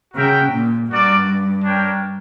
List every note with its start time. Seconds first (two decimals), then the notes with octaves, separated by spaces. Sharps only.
0.14 C#3 F#4 A#4 E5 G5
0.52 A#2
0.89 G2 F#4 A#4 D5
1.64 D4 A#4 C#5 G5